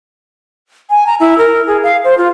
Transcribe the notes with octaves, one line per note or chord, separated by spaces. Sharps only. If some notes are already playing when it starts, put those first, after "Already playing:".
G#5
A#5
E4
A#4
G#4
F5
C5
F4